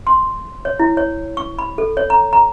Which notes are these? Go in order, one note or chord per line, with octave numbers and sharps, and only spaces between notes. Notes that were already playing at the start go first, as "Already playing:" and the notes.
C6
C#5
E4
C#5
C#6
B5
A4
C#5
A#5
A#5